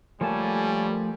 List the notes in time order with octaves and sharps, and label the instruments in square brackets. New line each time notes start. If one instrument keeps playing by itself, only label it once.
[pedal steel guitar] F3 A3 A5 [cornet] G3 [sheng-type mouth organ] A#3 A4 C#5 [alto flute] G#5